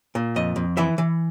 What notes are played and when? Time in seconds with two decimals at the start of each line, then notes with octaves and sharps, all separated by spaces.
0.15 A#2
0.36 F2 D#5
0.56 F2
0.77 E3 E5
0.98 E3